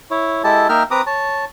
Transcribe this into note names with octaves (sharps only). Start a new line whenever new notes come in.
E4 C#5
G#3 E4 G4 A4 A5
A#3 D#4 A#4 E5 G5 F6
C4 B4 A#5 D6 D#6
C#5 A5